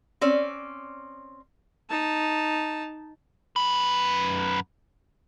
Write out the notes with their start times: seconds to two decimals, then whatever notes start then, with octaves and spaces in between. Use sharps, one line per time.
0.21 C4 C#4 D5
1.89 D#4 A5
3.56 F#2 B4